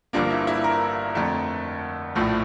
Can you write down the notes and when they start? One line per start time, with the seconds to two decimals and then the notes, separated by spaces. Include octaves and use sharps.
0.13 G1 G2 F3 A#3 D4
0.30 E4
0.47 E4
0.64 A#4
1.15 F2 D3 A3
2.15 A#1 A2 F3 A3